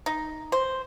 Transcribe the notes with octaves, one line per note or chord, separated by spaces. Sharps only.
D#4
C5